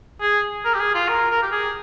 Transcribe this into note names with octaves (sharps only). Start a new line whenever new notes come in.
G#4
A#4
G4
G#4
F4
A#4
A#4
G4
G#4